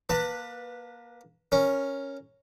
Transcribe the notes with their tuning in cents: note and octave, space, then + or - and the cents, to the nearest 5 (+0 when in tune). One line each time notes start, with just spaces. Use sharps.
A#3 +25 B4 -5 A5 +35
C#4 -5 A#4 +0